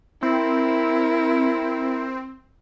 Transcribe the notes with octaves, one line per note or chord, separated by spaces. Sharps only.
C4 E4 A#4